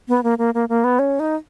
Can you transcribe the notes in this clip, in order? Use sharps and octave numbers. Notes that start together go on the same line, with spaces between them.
B3
A#3
A#3
A#3
A#3
B3
C#4
D#4